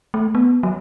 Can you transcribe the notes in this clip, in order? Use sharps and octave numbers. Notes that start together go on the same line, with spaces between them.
A3
B3
F#3